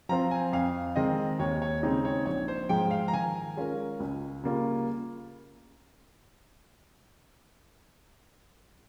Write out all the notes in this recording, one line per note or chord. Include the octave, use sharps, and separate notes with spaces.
F3 C4 F4 C5 A#5
G#5
F2 F5
D#3 G#3 C4 D#5
D#2 C#5
C#5
C#3 G#3 C4 D#4
C#5
A#1 C#5
C5
G#2 F3 G#3 G5
F5
A#5
D#3 G#5
G#3 C#4 F4 A#4
C#2
C#3 G3 A#3 F4